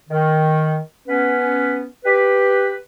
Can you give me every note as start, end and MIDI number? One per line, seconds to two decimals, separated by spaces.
0.09 0.79 51
1.08 1.86 59
1.08 1.86 61
1.08 1.86 71
2.05 2.76 67
2.05 2.76 71